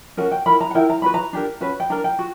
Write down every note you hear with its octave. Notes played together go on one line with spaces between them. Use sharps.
C#4 F#4 A#4 F#5
G5
E4 A#4 B5
A#5
F#5
E4 A#4 G5
A#5
C#4 F#4 B4 B5
A#5
D4 G4 A#4
C#4 F#4 B4
G5
D4 A#4 A#5
G5
F#4